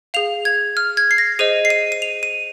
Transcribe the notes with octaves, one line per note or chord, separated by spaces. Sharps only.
G#4 F5 F7
G#6
F6
G#6
C7
A#6
G#4 C5 D#5 D#7
C7
D#7
D#7
F7
D#7